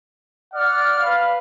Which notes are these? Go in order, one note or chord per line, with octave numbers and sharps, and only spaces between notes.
D5 F#5 F6
B4 F5